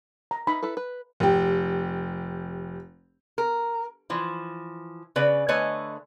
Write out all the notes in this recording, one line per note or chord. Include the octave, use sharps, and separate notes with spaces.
A#5
D#4 B5
E4 A4 B4
B4
F1 G4
A#4
E3 F3
C#3 B4 D5
D3 A3 B4 C#5 D#5 G#5